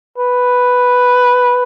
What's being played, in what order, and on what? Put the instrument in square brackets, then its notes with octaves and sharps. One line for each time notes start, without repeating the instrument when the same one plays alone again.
[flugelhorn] B4